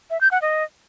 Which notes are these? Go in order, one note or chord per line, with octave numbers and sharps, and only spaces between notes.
E5
G6
F#5
D#5